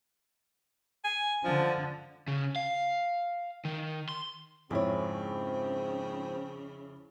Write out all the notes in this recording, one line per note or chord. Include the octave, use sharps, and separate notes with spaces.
G#5
D3 F3
C#3
F5
D#3
C6
F2 G#2 C#3 F3 C4 E4 C#5